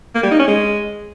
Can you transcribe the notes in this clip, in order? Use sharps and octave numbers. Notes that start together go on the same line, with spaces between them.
A#3
G3
D#4
C#4
G#3